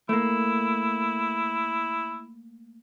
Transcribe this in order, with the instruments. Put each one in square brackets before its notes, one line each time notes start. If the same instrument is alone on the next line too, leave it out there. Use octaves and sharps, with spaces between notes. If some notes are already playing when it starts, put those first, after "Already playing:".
[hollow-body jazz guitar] A3 A#3 [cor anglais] E4